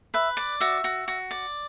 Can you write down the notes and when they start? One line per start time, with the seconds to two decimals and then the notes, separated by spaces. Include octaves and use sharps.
0.14 B4 E5
0.37 D5
0.60 F#4 E5
0.84 F#4
1.08 F#4
1.31 D5